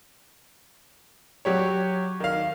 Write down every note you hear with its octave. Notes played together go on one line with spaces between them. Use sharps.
F#3 G4 C#5
D#3 F5